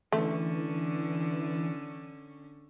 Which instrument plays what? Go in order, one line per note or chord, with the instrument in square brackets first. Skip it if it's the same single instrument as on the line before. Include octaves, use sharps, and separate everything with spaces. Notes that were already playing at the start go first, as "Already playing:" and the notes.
[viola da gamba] D3 C#4 [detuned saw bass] E3 [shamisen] A3